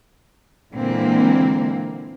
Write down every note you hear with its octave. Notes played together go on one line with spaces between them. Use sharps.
A#2 D3 E3 G#3 A#3 C4